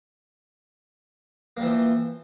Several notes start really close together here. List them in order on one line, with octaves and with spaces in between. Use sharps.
A#3 G3 E3 F3